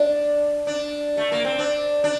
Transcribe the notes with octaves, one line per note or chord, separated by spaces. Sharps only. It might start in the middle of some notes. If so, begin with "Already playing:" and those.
Already playing: D4
D4
A3
A#3
C4
D4
D4